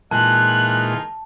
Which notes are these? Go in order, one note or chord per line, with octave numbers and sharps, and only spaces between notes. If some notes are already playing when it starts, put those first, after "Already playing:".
A#2 E3 G#3 D#4 F4 G#4 A5 F#6